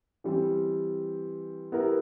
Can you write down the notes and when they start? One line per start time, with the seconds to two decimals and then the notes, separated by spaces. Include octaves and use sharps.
0.24 E3 G3 C4
1.72 B3 E4 G4 A#4